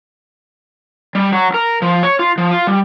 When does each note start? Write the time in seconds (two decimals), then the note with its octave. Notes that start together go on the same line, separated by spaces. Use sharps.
1.15 G3
1.33 F#3
1.54 A#4
1.82 F3
2.03 C#5
2.19 F4
2.38 F3
2.51 F4
2.67 G3